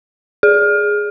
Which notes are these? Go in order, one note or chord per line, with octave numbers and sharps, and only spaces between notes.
G#4